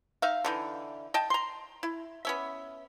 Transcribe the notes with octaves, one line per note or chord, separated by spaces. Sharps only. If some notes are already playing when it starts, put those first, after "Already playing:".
D#4 E5 F5
D3 E3 D#4
D#5 G5 A5
A#5 C6
E4
B3 C#4 E5